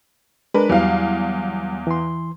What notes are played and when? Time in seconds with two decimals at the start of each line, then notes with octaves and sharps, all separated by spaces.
0.54 G#3 D4 A#4 B4
0.69 E2 F#3 G3 F5
1.87 E3 C6